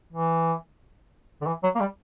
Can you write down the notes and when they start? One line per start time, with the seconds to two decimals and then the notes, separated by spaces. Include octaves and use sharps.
0.13 E3
1.41 D3
1.47 E3
1.63 F#3
1.75 A#3
1.80 G3